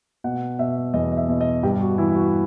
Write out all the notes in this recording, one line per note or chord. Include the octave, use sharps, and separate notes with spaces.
B2 F#5
B2 E5
E2 D#5
D#5
E5
B2
D#5
G2 G4
F#4
E3 E4
F#4